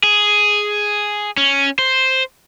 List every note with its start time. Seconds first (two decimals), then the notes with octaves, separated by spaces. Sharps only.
0.03 G#4
1.37 C#4
1.79 C5